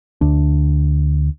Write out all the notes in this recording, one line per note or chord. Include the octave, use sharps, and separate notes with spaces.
D2 D4